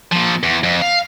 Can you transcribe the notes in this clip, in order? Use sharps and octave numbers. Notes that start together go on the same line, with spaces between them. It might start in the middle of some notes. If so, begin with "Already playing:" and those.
A#2 F3
E2
F2
F5